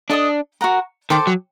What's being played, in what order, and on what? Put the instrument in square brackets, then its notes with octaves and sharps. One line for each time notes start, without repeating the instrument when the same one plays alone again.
[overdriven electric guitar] D4 [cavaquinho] A4 D#5 A5 D#6
[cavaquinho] F#4 A#4 F#5 A#5
[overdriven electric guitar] D#3 [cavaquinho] A4 C5 G5 D6
[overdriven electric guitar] F#3